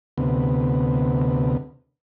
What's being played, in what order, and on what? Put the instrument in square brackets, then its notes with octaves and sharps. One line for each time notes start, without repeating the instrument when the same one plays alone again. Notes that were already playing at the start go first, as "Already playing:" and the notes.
[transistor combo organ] D2 C3 B3